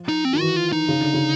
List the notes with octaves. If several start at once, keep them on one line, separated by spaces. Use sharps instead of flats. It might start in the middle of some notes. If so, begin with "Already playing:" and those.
Already playing: F3
D#4
C4
D#3
E3 F#4
F4
D#4
C#3
D3
C#3